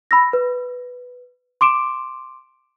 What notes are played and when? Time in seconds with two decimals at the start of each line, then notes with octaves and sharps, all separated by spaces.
0.11 B5 E6 A#6
0.33 B4
1.61 C6 D6 D7 E7